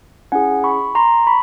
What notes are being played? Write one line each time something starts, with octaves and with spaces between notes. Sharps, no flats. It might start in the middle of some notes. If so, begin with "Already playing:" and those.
C#4 E4 G#4 F#5 G#5
B5 C#6
A#5 C6
B5 C#6